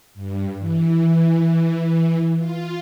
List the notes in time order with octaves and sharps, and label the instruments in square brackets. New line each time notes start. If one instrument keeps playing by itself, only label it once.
[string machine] G2
E3
F4